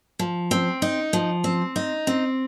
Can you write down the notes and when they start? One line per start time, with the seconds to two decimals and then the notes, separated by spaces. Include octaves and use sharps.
0.19 F3
0.51 C4
0.82 D#4
1.13 F3
1.44 C4
1.76 D#4
2.07 C4